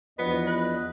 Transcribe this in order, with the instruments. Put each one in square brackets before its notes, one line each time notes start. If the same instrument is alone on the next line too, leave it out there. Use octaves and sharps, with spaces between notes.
[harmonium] E2 D#5 [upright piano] F3 D4 F#4 [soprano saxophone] B3
[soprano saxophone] B4